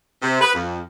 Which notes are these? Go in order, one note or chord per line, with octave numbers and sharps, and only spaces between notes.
C3
B4
F2